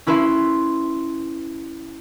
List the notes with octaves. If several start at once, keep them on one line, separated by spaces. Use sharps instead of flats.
C#4 E4 B4 E5 C6